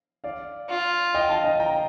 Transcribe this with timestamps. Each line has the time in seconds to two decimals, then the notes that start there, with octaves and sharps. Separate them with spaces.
0.24 D5 F5
0.69 F4
1.14 D#5 G5
1.29 F5 A5
1.44 D#5 G5
1.60 G5 A#5